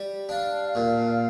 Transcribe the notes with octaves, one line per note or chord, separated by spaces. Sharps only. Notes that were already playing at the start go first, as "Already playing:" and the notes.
Already playing: G3 G4
D4 F5
A#2